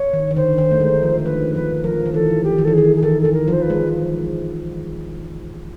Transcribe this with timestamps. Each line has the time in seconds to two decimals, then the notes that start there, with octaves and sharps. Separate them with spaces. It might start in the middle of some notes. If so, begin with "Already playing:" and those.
Already playing: C#5
0.13 D#3
0.31 D#3
0.36 D3 C5
0.58 D#3
0.71 A3
0.81 G#3
1.03 F3
1.18 D3
1.25 D#3 B4
1.55 F3 B4
1.84 F3 A#4
2.06 D#3
2.14 E3 A4
2.44 G4
2.58 D#3
2.65 E3 A4
2.73 D#3 G#4
2.96 G#4
3.03 D#3 A4
3.22 D#3 A4
3.33 A#4
3.48 F3
3.53 C5
3.62 B4
3.70 G#3